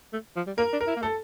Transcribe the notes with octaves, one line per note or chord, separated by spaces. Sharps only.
A3
F3
G3
A#3 A#4
D4
A#4
E4
A#3
A3 A4